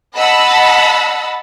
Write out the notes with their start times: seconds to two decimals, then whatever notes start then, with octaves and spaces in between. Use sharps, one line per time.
0.16 D#5 F#5 A5 B5 E6